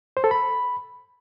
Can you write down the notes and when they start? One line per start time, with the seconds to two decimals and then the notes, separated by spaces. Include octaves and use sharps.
0.17 C5
0.24 A4
0.31 B5